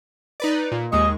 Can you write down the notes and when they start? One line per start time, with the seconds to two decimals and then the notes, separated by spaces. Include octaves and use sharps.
0.40 D#4 B4 D5
0.72 A#2
0.92 D#2 G#3 D#5 C#6